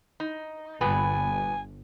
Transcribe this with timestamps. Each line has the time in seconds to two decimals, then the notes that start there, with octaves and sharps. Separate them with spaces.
0.20 D#4
0.81 G1 G2 A#2 B3 G#5